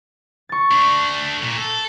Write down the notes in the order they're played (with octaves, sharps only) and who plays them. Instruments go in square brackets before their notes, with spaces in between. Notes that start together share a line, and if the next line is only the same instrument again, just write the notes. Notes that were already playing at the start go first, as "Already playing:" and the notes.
[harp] C#6 A6
[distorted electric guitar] A3 D4
A#2
A4